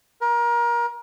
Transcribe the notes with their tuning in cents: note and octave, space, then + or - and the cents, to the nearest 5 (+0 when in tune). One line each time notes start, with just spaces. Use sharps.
A#4 +30